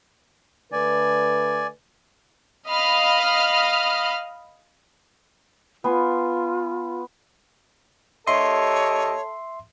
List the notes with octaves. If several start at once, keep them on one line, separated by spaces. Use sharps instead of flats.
D3 A3 B4 D5 G#5
D#5 F5 B5 F6
B3 F4 G#5 C6
D#2 A4 C#5 D#5 E5 C6